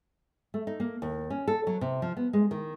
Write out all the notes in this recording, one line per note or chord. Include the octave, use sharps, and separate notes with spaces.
A3
D#4
A#3
D#2
C#4
A4
F#3
C3
F3
B3
G#3
D#3